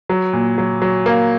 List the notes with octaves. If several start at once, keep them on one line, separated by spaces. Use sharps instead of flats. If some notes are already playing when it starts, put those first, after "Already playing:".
F#3
A#2
F#3
F#3
A#3